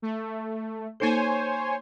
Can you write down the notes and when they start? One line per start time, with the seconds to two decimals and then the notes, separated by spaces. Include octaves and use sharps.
0.02 A3
1.00 A#3 D#4 A4 C5 C#5 G#5